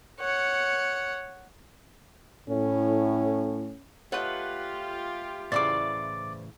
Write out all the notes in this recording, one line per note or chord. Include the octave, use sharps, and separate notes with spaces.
C#5 F#5
A2 C#4
A3 F4 G4 B4 C#5 D#5 F#5
A2 C#3 E3 C5 D5 D6 A6